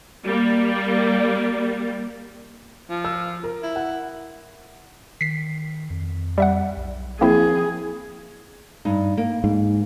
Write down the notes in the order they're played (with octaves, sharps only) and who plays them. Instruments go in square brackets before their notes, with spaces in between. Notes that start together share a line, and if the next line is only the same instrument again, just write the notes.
[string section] G3 A#3
[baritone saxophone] F3
[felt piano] E6
A#4
[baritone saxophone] E4
[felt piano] F#5
[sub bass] D#3 [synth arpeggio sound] B6 C7
[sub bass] F2
[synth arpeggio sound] G3 E5 F#5
[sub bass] B1
[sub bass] F3 [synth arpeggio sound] A#3 C4 E4 [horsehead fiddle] G#4
[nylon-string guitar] G2 D#4
A#3
[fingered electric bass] G#2